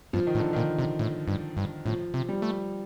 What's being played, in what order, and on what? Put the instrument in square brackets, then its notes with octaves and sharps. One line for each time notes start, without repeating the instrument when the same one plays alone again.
[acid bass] G2 [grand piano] F3
[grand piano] D#3
[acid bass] A2
[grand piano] D3
[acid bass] A#2 [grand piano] D#3
[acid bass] C3
A2
G2
G2
[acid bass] A2 [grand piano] F3
[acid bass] C3
[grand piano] G3
[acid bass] A3